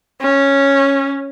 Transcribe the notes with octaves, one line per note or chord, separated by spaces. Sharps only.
C#4